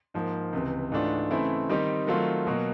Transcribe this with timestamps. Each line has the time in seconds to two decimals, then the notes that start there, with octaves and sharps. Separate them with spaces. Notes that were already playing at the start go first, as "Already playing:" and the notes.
0.14 G#2 F3 A#3
0.53 C#2 C3 E3
0.92 G#2 E3 A3 D4 F4
1.31 C#3 E3 A3 C4 E4
1.69 D#3 G3 C4 D#4 G4
2.07 D#3 F#3 A3 C4 F4
2.47 B2 F#3 A#3